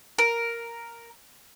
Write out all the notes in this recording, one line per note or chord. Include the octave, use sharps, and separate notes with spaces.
A#4